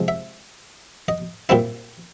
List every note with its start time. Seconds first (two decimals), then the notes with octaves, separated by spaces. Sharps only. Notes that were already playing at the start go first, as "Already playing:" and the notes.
Already playing: C3 F3 G#3
0.08 E5
1.08 D#5
1.49 A#2 G3 C4 E4